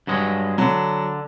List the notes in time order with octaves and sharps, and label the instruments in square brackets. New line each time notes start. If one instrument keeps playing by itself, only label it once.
[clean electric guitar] G2 F#3 G#3
[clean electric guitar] D3 [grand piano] F#3